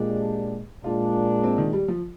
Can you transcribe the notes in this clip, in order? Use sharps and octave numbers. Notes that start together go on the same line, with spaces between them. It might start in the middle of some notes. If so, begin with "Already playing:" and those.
Already playing: A#2 G#3 D4 G4
A#2 G#3 D4 F4
C4
D#3
G3
F3